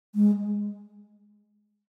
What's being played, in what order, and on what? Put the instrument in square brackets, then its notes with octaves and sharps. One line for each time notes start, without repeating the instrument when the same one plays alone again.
[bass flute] G#3